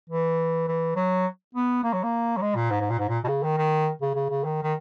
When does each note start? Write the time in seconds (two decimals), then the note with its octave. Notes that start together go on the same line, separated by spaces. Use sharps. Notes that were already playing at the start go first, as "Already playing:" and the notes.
0.10 E3
0.68 E3
0.96 F#3
1.55 B3
1.84 A#3
1.93 F#3
2.03 A#3
2.37 F#3
2.42 G#3
2.55 A#2
2.71 G#2
2.81 G#2
2.90 A#2
2.99 G#2
3.09 A#2
3.24 B2
3.28 C#3
3.43 D#3
3.58 D#3
4.01 C#3
4.15 C#3
4.30 C#3
4.44 D#3
4.63 D#3